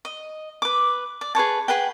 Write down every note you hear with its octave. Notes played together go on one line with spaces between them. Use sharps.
D#5
B4 D6
D5
G#4 B4 C#5 A5
G#4 B4 F#5 G5